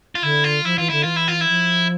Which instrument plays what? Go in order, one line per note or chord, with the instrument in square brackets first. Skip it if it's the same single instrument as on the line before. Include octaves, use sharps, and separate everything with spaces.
[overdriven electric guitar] F4
[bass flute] D3 [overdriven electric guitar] E4
[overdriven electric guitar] F4
[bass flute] F3 [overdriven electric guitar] E4
[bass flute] E3 [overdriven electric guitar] F4
[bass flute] D3 [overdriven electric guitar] E4
[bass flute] E3 [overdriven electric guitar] F4
[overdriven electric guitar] E4
F4
E4
[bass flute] F3